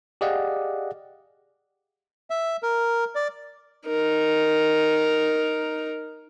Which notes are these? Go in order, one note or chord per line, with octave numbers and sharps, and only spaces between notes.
G4 G#4 D5 D#5 F5 F#5
E5
A#4
D5
D#4 A#4